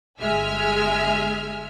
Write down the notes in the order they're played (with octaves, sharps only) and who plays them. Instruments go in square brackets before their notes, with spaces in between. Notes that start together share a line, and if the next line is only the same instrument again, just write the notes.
[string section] G1 G#3 E5 G#5 F6